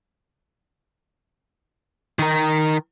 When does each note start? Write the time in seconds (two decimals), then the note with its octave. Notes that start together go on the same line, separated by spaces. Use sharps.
2.19 D#3 A#4